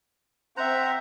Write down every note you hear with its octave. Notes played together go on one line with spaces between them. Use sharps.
C4 C5 E5 F#5 A#5